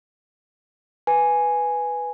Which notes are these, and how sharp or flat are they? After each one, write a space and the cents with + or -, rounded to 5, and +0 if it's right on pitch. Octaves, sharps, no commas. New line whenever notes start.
B4 +0 G#5 +0